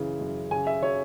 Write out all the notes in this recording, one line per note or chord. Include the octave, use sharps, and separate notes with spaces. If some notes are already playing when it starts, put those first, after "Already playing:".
Already playing: F#2 C#3 E3
F#2
C#3 G#5
E5
F#3 C#5